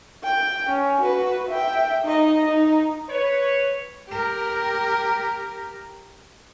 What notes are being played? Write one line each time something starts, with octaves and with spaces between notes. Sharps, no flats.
G5
C#4
F#4 B4
E5 G5
D#4 D#5
D#4
B4 C#5
G4 A#4